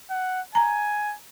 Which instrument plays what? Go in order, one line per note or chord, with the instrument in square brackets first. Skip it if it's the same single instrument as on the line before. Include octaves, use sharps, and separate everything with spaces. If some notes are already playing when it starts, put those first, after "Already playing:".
[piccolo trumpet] F#5
[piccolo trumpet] G#5 [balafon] A#5